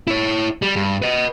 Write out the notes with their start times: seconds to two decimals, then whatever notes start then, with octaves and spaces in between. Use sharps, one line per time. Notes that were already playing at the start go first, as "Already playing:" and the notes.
0.07 E4 C#5
0.62 G3
0.76 G2
1.02 B4 D#5